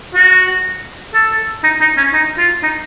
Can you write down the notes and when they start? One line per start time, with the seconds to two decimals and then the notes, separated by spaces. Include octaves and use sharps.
0.15 F#4
1.14 A4
1.64 D#4
1.81 D#4
1.97 C#4
2.14 D#4
2.38 F4
2.63 D#4